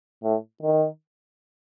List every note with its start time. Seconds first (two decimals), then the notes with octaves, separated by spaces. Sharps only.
0.23 A2
0.63 D#3